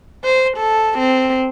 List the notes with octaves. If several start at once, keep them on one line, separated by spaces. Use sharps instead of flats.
C5
A4
C4